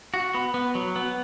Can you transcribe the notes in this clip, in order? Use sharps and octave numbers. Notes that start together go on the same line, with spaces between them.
F#4
B3
B3
F#3
B3